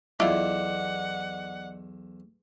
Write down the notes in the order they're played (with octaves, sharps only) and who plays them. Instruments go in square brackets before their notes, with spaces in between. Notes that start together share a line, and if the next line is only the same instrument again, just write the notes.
[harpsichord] B1 E2 [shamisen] E4 F4 [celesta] D5 D#5 D6 [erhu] F#5